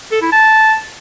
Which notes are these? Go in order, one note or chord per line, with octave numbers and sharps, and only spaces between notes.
A4
E4
A5